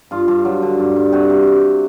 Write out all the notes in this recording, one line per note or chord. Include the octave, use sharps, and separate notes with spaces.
G2 F4
G2
F#3
D3
G2
G2
C3 F#4
C3